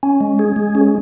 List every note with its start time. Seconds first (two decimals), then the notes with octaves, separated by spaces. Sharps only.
0.03 C#4
0.21 G#3
0.39 G#4
0.56 G#3
0.75 C#4